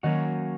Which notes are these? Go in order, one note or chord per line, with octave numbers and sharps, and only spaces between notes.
D#3 F#3 A#3 C#4 F#4